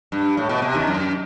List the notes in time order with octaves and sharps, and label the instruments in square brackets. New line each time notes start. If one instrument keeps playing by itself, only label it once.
[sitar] G2
A2
B2
C3
D#2 D#3
F#2